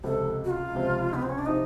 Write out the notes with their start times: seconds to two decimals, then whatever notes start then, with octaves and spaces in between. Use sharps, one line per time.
0.04 C#2 C3 F3 A4
0.44 F#4
0.51 F4
0.75 C#2 C3 F3
1.14 B3
1.22 C4
1.29 C#4
1.38 D4
1.46 C3 F3 D#4